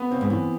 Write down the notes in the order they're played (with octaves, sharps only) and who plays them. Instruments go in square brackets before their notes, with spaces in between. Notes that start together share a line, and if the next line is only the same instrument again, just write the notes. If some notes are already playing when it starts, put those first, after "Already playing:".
Already playing: [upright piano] B3
[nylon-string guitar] C#3 [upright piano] C4
[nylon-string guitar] G#2
[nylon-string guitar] F#2 [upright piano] E3